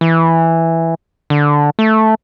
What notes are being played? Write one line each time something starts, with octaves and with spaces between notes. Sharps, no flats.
E3
D3
A3